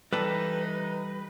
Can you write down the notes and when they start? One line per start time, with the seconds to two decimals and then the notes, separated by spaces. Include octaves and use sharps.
0.13 E3 G3 D#4 G4 A4 B4